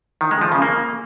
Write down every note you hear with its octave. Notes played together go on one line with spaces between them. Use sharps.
D#3
G#3
F3
C#3
A#3